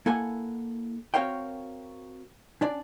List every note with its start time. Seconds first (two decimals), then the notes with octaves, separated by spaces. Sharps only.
0.06 A#3 E4 A4 F#5 G#5
1.14 C4 F#4 A#4 C#5 F5 G5
2.61 C#4 D4 D5